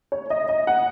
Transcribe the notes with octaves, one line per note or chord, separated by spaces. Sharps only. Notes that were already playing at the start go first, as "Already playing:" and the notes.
C#5
D#5
D#5
F#5